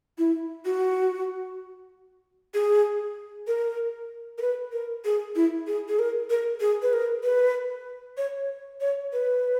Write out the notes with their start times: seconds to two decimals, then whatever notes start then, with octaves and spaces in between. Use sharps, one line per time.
0.18 E4
0.65 F#4
2.54 G#4
3.47 A#4
4.38 A#4
4.42 B4
4.72 A#4
5.05 G#4
5.36 E4
5.67 G#4
5.88 G#4
5.99 A#4
6.30 A#4
6.61 G#4
6.82 B4
6.93 A#4
7.23 B4
8.18 C#5
8.81 C#5
9.13 B4